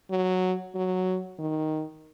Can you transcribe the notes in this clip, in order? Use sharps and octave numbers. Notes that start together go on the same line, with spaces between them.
F#3
F#3
D#3